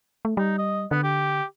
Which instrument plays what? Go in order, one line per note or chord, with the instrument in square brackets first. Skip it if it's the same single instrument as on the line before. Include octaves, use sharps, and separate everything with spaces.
[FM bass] A3
[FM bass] G3 [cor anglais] D#4
[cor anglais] D#5
[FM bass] D3 [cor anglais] B3
[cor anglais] G4